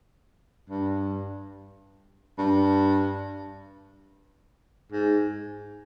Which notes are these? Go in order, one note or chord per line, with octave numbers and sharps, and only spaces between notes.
G2
G2
G#2